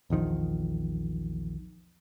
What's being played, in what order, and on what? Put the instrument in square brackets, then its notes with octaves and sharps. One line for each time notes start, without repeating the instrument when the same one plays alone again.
[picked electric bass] A#1 E2 D#3 F3